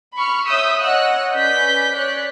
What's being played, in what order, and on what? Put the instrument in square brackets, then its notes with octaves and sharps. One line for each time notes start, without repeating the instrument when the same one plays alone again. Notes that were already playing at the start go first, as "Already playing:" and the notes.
[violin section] B5 C#6 F6
C#5 E5 D#6 E6 G6 B6
C#5 D#5 F#5 E6 F#6
C#4 B4 D5 G6 B6
C#5 D5 F#6 B6